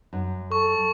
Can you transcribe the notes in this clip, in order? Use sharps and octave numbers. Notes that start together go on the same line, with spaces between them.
F#2
A4 C#6